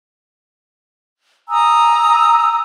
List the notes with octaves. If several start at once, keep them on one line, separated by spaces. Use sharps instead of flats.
G#5 A#5 D#6 E6